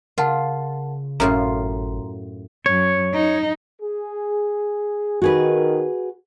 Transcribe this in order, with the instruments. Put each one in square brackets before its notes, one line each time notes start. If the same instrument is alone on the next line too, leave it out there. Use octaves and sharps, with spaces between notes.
[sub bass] C#3 [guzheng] F4 [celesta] A#4 F#5 A5
[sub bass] G#1 [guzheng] F#2 A2 F4 [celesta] A#5 C6
[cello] F#2 [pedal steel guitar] C#5
[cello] D#4
[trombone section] G#4
[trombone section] D#3 [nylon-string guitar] F#4 G#4 B4